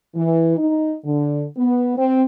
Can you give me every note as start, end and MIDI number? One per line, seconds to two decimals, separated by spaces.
0.14 0.57 52
0.57 0.94 63
1.04 1.44 50
1.58 1.93 59
1.96 2.22 60